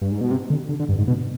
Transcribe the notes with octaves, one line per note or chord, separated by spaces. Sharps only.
G2
G#2
B2
C3
D3
D3
D3
G2
G#2
B2